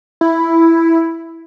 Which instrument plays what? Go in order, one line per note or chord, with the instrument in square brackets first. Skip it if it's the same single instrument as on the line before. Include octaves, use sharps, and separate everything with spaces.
[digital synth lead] E4